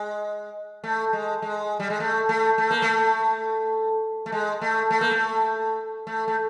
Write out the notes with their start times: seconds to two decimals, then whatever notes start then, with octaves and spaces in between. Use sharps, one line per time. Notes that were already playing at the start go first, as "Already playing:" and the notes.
Already playing: G#3
0.84 A3
1.13 G#3
1.42 G#3
1.80 G3
1.90 G#3
2.00 A3
2.29 A3
2.58 A3
2.71 A#3
2.82 A3
4.26 A3
4.32 G#3
4.61 A3
4.91 A3
5.01 A#3
5.11 A3
6.07 A3
6.28 A3